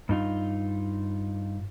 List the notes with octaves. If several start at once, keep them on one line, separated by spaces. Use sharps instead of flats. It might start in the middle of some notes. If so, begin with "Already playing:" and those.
G2 D#4 F4